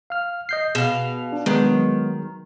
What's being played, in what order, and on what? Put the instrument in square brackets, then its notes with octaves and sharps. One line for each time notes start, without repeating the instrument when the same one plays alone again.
[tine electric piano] F5 F6
D#5 G6 C7
[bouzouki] B2 F5 [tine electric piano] G#4
[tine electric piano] D4
[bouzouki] D#3 [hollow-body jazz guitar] G#3 B3
[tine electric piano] F#3